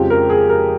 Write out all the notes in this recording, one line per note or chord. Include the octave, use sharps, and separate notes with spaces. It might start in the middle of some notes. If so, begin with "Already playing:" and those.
Already playing: F2 C#3 F3 G#3 G4
A#4
G#4
A#4